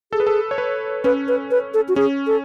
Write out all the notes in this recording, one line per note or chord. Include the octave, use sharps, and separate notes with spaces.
G#4 A4
B4
A4
C#5
B4
C#4 B4
B4
B4
A4
F#4
C#4 G#4
A4